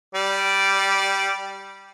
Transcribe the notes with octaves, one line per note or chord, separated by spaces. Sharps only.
G3 D5